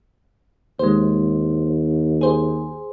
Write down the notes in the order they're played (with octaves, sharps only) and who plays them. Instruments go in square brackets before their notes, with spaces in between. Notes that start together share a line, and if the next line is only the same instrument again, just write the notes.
[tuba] D#2 [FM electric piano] G#3 C5
[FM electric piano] G#4 C5